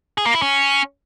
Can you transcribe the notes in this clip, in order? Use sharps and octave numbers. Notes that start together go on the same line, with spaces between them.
G#4
A#3
E4
C#4